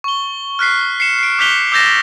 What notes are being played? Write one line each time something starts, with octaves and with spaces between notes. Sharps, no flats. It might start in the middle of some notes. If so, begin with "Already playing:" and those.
C#6 G7
F6 F#6 B6 C7
C7 C#7 E7
C7 D7
D6 F#6 G6 B6 F7 G7
D6 E6 G6 A6 A#6 E7